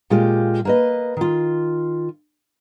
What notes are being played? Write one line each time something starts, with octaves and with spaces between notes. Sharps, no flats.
A#2 G#3 F4 G4
A#3 B4 D#5
D#3 F4